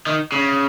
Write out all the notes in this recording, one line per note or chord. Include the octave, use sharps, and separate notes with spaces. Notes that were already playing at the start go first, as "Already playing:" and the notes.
D#3
C#3